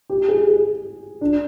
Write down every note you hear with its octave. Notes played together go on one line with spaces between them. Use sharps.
G4
G#4
G#4
D4